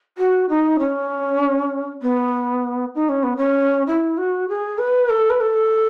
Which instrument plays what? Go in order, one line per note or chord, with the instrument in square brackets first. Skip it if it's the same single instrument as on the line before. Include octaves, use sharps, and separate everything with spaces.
[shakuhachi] F#4
D#4
C#4
B3
D#4
C#4
B3
C#4
E4
F#4
G#4
B4
A4
B4
A4